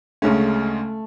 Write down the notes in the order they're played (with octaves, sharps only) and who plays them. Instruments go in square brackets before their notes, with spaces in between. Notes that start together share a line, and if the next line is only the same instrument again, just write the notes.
[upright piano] D2 C#3 G#3 C#4 [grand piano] A3